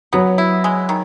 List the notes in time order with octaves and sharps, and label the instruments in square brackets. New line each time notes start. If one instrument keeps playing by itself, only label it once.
[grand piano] F#3 [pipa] B3
[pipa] E4
G#3
D#3